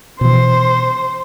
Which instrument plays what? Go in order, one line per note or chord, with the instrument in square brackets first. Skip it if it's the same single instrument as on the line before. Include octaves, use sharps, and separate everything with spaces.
[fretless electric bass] B2 E3 [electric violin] C5